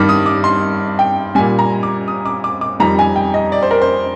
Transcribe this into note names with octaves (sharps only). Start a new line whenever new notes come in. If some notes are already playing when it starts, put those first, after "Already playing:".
Already playing: G2 D#3 G3 D6
D#6
D6
C6
G5
A#2 G3 G#5
A#5
D6
D#6
D6
D6
D6
F2 D#3 G3 A#5
G#5
G5
D#5
D5
C5
A#4
C5